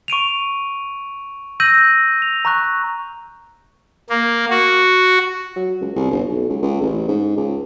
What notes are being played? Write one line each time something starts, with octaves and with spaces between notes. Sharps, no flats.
C#6 D7 D#7 F7
E6 G6 A#6 D#7 F#7
F7
A#5 C#6 F#6
A#3
F#4
F#3
C#2
C2
G1
B1
C#2
C#2
A1
G#2
C#2